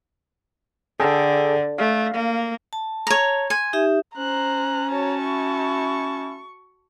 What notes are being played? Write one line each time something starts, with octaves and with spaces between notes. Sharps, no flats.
D3 G#4 A4 G5
A3 F5
A#3
A5
C#5 A#5
G#5 C6
D#4 G4 E5
C#4 C5 A#5 F#6
F#4 C#5 A5
E4 C#6